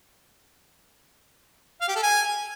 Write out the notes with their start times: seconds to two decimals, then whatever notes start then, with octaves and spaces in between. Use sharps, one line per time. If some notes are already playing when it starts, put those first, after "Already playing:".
1.81 F5
1.88 G4
1.96 A4
2.03 G#5